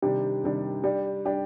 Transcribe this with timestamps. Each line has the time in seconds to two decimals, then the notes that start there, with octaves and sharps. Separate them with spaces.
0.02 C3 D#3 G3 D4 G4
0.44 C3 D#3 G3 D4 G4
0.84 G3 D4 G4
1.25 G3 D4 G4